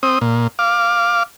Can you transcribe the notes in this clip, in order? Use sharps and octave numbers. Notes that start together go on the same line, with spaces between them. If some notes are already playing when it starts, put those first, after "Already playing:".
C4 D#6
A#2
F5 D6